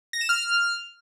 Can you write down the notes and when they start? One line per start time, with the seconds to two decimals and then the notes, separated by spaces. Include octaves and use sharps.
0.13 A#6
0.21 E7
0.29 F6